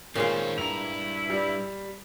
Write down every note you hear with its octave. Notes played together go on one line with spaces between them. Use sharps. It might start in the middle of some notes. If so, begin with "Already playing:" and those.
A#2 D#3 G#3 C4 C#4 F5
G2 E4 A#5 F7
G3